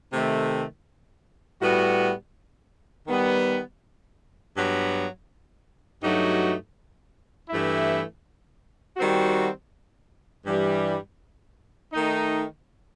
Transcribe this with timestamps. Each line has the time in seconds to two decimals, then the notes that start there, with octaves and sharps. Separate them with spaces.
0.11 C3 D#3 A3
1.59 A2 G3 B3 F#4
3.06 D#3 G3 B3
4.54 G2 F#3 B3
6.01 G2 F#3 A3 D#4 F#4
7.49 G2 E3 A3 E4
8.97 D#3 G3 C4 F#4
10.45 G2 E3 G3
11.92 D#3 A3 D#4